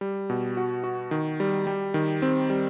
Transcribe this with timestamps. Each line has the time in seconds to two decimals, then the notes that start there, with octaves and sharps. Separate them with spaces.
0.01 G3
0.30 B2
0.57 F#4
0.84 F#4
1.11 D#3
1.40 G3
1.67 G3
1.94 D#3
2.22 C4
2.50 G3